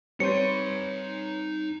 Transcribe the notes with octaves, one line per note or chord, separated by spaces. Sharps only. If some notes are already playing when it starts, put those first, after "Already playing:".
G3 C4 D#4 B4 C#5 C6 G6 C#7